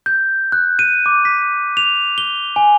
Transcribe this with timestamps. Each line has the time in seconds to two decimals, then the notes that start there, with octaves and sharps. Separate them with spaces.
0.06 G6
0.52 F#6
0.79 D#7
1.06 D6
1.25 B6
1.77 F7
2.18 G7
2.56 G#5